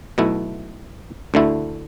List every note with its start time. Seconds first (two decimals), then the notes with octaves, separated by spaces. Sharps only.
0.18 B1 B2 A3 E4
1.34 D2 D3 A3 E4